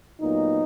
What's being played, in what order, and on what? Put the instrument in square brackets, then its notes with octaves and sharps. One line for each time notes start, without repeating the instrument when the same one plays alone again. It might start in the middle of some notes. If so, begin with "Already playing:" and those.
[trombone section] A#2 F#3 B3 D#4